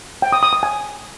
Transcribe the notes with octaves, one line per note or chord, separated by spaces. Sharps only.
G5
D#6
D#6
D#6
G#5